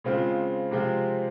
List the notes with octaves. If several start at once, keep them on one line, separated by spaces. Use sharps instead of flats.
C#3 G#3 C4 F4
C3 F3 G#3 C4 F4